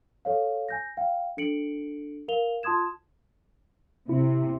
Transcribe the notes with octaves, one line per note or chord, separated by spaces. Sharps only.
A4 C#5 F5
G#5 G6 A#6
F5 G5
D4 A4 C#7 D7 F#7
A#4 F5 F7 G7
F4 A5 C6 D#6 G#6 E7
C3 E4